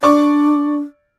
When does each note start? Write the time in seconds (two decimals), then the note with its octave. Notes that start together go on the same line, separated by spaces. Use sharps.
0.03 D4 D5 C#6 D6